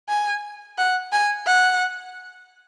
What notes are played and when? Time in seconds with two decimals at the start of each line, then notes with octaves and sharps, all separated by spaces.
0.09 G#5
0.78 F#5
1.12 G#5
1.46 F#5